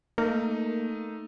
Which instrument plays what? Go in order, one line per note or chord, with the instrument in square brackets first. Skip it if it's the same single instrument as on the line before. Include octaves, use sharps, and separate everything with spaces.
[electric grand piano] A3 D#4 [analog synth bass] A#3